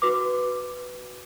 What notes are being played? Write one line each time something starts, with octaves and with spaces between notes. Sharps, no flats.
F#4 B4 D6